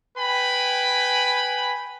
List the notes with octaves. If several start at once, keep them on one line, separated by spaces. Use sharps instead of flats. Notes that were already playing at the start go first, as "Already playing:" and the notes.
B4 G5 G#5 B5